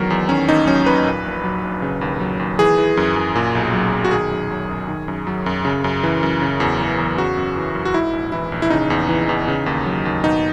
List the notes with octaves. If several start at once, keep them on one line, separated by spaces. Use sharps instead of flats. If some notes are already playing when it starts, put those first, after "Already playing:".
Already playing: E2 D#3 F#3 A#4
E2
D#3 C#4
D#2 D#4
F#3 C#4
D#2 B4
A#2
A#1
F#3
A#1
C#3
D#2
F#3
D#2
E3 G#4
E3
F#2
F#2
A#2
B1
F#3
B1
F#4
D#3 G#4
F#2
F#3
F#2
D#3
F#2
F#3
F#2
C#3
F#2
E3
F#2
C#3
E2
E3
E2
C#3 F#4
F#2
E3
F#2
F#4
G#2 E4
A#1
E3 E4
A#1
E4
C#3 D#4
E2
E3
E2
C#3
D#2
F#3
D#2
B2 D#4